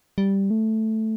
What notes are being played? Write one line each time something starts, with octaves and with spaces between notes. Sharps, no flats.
G3
A3